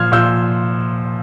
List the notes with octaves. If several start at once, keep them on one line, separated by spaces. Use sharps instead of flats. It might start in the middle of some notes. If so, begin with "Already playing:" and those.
Already playing: A#2 F3 C6 F6 G#6
A#2 F3 E6 G6